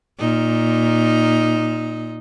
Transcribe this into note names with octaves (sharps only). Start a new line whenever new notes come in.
A#2 D#4